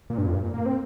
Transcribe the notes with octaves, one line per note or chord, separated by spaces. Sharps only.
A#2
G2
F2
G2
A#2
A#3
C4